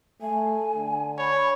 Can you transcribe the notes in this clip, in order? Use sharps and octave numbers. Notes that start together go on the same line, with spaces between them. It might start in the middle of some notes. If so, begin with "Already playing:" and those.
A3 G#5
D3
C#5 B5